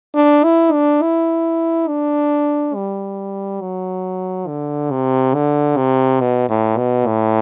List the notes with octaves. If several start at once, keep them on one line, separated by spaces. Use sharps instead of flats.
D4
E4
D4
E4
D4
G3
F#3
D3
C3
D3
C3
B2
A2
B2
A2